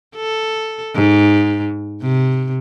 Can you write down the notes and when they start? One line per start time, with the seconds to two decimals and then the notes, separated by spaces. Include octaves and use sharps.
0.16 A4
0.95 G#2
2.02 C3